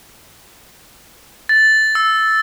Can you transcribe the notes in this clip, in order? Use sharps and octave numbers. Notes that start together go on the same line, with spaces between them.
A6
E6